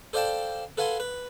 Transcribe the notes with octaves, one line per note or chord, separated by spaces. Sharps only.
A4 C5 D5 F5 G5 A5
A4 B4 F5 F#5 G#5 C6
B4